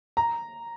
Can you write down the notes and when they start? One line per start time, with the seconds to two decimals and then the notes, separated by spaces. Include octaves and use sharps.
0.17 A#5